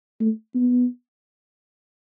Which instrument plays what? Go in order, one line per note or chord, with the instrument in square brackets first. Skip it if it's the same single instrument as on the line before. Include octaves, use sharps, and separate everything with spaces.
[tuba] A3
B3